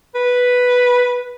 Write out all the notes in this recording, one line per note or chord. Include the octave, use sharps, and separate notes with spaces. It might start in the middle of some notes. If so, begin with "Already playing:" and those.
B4